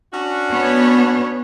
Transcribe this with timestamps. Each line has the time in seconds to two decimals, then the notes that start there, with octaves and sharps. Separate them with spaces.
0.13 C#4 D4 F#4
0.50 B3 C#5